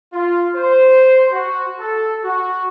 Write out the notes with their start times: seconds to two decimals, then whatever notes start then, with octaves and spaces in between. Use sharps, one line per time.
0.14 F4
0.56 C5
1.33 F#4
1.80 A4
2.24 F#4